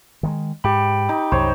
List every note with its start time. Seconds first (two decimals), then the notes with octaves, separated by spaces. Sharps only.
0.23 D#3 G3 G#3
0.64 G#2 G4 G5 B5
1.09 D#4
1.32 C2 F#2 C5 C#5